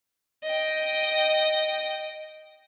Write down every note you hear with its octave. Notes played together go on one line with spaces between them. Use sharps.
D#5 G5